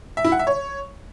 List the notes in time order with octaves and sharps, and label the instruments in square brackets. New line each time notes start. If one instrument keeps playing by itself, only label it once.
[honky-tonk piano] E5
E4
F#5
E5
C#5